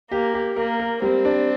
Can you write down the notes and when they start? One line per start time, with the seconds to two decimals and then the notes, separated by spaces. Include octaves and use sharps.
0.11 A#3 G4
0.34 G4
0.56 A#3 A#4
0.80 A#4
1.02 G3 C4
1.25 D4